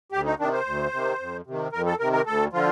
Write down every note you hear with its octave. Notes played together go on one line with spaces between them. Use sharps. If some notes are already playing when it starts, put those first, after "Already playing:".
D2 G4
D#4
C3 D#3 D4
C5
D2
C3 D#3
F2
C3 D#3
F2 A#4
A4
C3 D#3 A#4
A#4
D2 A4
D3 F3 F4